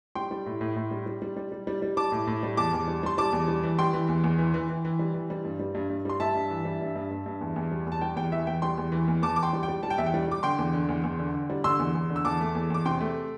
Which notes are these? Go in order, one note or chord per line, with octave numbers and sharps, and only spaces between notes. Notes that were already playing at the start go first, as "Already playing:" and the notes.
G3 G5 C6
G3
A2
A2
A2
G3
G3
G3
G3
G3
G3
G3
G3 A5 D6
A2
A2
G3
E2 A5 D6
E2
G3
G3 C6
G3 A5 D6
E2
G3
E3
G3 G5 C6
E3
E2
E2
E3
E3
E3
E3
G3
E3
G3
G2
G3
G2
G2
G3 C6
G3 E5 A5
G2
E3
G3
G2
G2
G2
G2
E2
E2
G3
E2
A5
G3 G5
E2 G5
E3 E5
E2 G5
G3 G5 C6
E2
E3
E2
E2 A5 D6
E2 D6
G5 C6
G3
G5
G3
G3 A5
G5
E2 E5
G5
G3
G3 D6
D3 G5 C6
E2
D3
E2
E2
D3
D3
G3
D3 C6 E6
E2
E2
D3
E6
E2 A5 D6
A3
E2
E2 D6
C3 G5 C6
A3